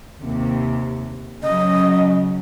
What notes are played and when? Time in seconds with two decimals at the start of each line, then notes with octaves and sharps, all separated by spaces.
0.22 D#2 C3
1.43 C#3 F#3 D#5